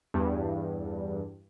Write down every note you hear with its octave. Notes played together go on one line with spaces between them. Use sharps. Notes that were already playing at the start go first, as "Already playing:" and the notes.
E2 G2